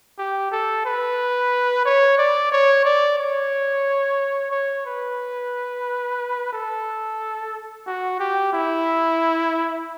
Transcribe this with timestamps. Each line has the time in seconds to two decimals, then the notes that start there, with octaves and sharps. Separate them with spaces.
0.19 G4
0.52 A4
0.85 B4
1.86 C#5
2.18 D5
2.52 C#5
2.85 D5
3.18 C#5
4.52 C#5
4.86 B4
6.53 A4
7.87 F#4
8.20 G4
8.53 E4